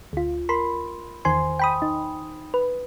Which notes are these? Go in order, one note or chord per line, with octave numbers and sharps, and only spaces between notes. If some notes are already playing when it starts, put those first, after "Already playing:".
D2 F4
A#4 B5 C6
E2 D#3 C5 G#5 C6
G5 B5 D#6
D#4
B4